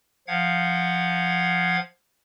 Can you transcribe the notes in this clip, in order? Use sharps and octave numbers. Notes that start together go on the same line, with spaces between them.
F3 F5 F#5 G#6